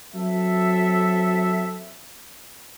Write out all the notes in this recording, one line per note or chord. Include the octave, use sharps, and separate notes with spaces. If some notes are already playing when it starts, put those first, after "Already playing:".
F#3 C4 A4 E5